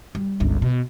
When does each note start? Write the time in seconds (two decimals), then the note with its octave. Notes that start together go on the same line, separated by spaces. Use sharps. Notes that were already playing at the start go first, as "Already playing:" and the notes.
0.15 G3
0.40 G1 C#2
0.62 B2